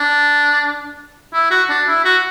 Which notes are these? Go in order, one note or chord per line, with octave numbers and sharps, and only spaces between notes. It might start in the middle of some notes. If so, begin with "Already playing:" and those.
Already playing: D4
E4
F#4
D4
E4
F#4